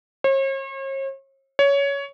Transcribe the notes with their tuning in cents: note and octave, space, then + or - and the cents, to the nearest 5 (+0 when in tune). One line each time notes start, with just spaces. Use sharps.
C#5 -45
C#5 +15